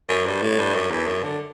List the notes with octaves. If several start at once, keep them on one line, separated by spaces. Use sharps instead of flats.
F#2
G2
A2
G2
F#2
E2
F#2
D3